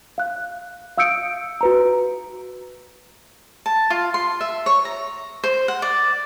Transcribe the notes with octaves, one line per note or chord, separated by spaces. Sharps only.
F5 F#6
F5 D#6 E6 G6 C#7 D7
F#4 B4 A#5
A5
F4
C6
E5
C#5
A#5
C5
F#5
D5